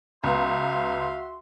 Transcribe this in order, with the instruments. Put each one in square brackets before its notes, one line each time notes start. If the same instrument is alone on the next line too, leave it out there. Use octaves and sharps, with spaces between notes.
[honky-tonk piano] C#2 B3 A#5 [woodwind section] F#4 E5 C6 [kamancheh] F5